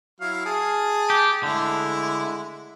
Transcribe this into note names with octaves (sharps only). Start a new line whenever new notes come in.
F#3 E4 F5
G#4 A5
G4
D3 G#3 A3 E4